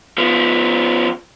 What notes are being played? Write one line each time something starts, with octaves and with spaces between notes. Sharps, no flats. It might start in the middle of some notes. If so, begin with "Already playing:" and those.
F3 B3